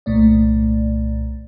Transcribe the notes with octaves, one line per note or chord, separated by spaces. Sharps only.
C2 A#2 A3 D5